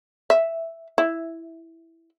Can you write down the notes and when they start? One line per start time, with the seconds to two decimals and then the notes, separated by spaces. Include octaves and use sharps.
0.30 E5
0.98 E4